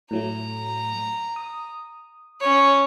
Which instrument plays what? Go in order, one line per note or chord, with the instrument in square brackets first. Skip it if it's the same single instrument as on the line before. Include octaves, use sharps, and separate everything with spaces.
[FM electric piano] A2 F#3 A3 [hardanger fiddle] A#5
[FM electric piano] D#6
[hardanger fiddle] C#4 C#5